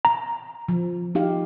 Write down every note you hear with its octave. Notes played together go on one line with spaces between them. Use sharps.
A#5
F3
D#4 G4 F5